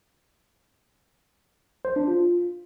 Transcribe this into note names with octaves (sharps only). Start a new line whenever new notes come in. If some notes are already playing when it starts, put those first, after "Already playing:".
C5
D4
F4